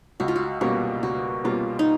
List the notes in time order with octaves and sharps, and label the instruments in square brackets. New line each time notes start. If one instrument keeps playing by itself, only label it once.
[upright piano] C#2 [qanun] F#4
[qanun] F4
F#4
[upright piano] B2 G3 A#3 C#4 [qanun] F#4
[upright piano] C#2 [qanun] F#4
[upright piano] B2 G3 A#3 C#4 [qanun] F4
[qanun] D#4